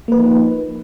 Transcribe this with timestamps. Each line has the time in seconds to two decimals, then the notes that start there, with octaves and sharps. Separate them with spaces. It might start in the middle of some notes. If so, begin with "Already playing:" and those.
0.08 A#3
0.12 B4
0.16 F3
0.19 D#4